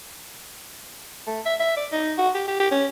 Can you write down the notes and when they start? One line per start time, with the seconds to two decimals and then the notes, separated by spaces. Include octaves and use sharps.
1.27 A3
1.45 E5
1.60 E5
1.76 D5
1.92 D#4
2.18 F#4
2.35 G4
2.48 G4
2.60 G4
2.71 C#4